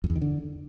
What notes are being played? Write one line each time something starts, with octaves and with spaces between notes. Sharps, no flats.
F2
E2
D#3
D3